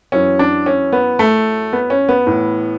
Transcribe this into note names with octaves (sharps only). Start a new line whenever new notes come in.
F#2 E3 C#4
D4
C#4
B3
A3
B3
C#4
B3
A2 E3